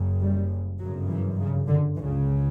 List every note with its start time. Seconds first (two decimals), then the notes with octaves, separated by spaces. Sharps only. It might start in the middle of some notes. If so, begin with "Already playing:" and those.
Already playing: F#1 F#2 C#3
0.20 G3
0.79 G1 F#2 C#3 F#3
1.08 E3
1.38 C#3
1.67 D3
1.96 C#2 C#3 E3